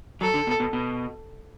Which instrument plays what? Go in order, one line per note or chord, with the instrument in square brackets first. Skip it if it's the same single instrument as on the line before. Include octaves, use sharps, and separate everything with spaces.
[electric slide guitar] F#3 [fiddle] A4
[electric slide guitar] D3
B2
B2
B2